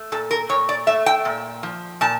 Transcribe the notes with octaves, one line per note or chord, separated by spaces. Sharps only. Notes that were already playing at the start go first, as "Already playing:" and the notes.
Already playing: A3
A#2 A4
A#4
A#2 C#5
D5
A3 E5
G5
A#2
F3
A#2 A5